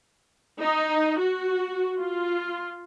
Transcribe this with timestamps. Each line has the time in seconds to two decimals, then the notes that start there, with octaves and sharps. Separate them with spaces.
0.59 D#4
1.20 F#4
1.98 F4